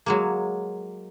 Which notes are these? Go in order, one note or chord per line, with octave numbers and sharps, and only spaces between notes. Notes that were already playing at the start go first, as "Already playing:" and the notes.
F#3 G#3 A#3